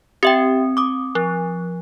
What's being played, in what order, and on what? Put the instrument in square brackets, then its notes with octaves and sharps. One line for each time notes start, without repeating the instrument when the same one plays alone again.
[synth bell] C4 [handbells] G4 E5 G5
[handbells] D6 D#6
[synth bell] F3